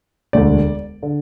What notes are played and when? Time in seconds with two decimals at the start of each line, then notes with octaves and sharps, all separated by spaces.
0.33 E1 D2 D3 D5
1.03 D3